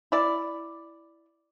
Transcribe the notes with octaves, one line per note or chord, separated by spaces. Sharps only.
E4 D5